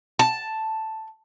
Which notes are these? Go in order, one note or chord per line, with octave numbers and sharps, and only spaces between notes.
A5